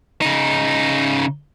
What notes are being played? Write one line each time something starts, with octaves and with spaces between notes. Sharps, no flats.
C#3 D#4